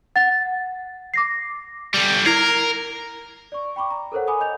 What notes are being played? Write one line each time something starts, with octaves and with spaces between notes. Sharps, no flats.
F#5 A6
D6 A#6 C7
D3 G3
E4 A#4 G#6 C7
D5 C#6
G5 B5 C#6 D6
A#5
A4 A#4 C5 C#5 F#5
G#5 B5 D6 D#6
D#5 G6 F7